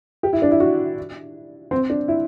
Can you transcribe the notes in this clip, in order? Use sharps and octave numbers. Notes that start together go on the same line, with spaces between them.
G4
E4
D4
E4
F#4
C4
D4
E4